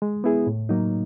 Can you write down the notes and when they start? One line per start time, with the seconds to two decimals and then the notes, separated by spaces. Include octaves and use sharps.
0.02 G#3
0.24 B3 E4 G#4
0.47 A2
0.69 F#3 A#3 D#4